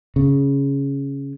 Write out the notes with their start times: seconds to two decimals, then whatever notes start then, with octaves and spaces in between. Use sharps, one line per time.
0.16 C#3